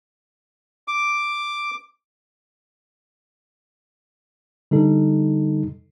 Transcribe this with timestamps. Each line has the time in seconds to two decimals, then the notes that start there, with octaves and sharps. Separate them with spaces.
0.88 D6
4.71 D3 G3 D#4 A4